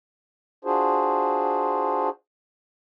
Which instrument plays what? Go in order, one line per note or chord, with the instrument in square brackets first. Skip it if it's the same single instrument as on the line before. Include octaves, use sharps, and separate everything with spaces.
[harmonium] D4 F4 F#4 G#4 C5